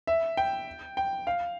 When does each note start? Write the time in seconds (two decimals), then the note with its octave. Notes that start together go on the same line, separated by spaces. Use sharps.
0.07 E5
0.37 G5
0.97 G5
1.27 F5